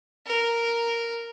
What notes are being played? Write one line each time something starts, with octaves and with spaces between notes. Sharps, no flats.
A#4